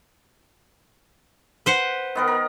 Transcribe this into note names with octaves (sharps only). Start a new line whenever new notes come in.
B4 C5 F#5
D#3 B3 A#4
A#4